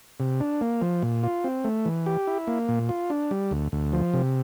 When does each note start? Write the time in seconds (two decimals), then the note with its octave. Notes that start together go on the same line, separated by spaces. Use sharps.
0.20 C3
0.40 D4
0.61 A#3
0.82 F3
1.03 A#2
1.23 F4
1.44 C4
1.64 A3
1.86 E3
2.06 G4
2.27 E4
2.47 A#3
2.68 A#2
2.89 F4
3.10 D4
3.31 G3
3.51 D2
3.72 D2
3.92 F3
4.14 C3